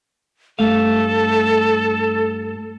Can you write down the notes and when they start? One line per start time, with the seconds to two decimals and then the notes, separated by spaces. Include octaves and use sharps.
0.59 G2 A3 A4 F5